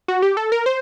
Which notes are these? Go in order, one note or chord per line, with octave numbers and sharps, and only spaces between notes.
F#4
G4
A4
A#4
C5